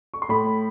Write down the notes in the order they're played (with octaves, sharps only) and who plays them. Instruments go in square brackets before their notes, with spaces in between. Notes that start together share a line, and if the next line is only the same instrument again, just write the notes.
[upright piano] C#6
C6
A2 B5